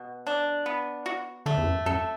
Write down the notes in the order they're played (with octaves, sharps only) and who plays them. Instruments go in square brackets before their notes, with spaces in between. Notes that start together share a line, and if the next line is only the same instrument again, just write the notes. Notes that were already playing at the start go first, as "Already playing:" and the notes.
Already playing: [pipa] B2
D4
B3
F#4
[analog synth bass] D3 [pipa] A3
[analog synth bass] E2
F#2
[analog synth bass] F#2 [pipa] A4